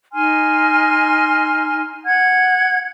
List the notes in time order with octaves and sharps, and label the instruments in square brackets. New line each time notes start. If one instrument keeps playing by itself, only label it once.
[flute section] D#4 G#5 C6 F6
F#5 G#6